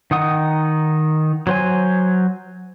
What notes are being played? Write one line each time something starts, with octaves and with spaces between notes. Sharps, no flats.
D#3 D#4 F#5 D#6
F#3 C5 G#5